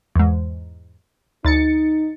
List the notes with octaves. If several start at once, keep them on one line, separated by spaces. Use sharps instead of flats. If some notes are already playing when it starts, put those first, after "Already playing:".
E2 G#2
D2 D#4 A6 C#7